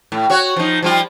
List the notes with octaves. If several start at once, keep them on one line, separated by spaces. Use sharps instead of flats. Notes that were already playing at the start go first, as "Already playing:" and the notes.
A2
F#4 C#5
F3 D#4
F3 G3 F4